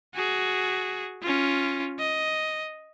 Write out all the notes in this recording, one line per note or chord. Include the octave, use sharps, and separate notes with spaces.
F#4 G#4
C#4 F4
D#5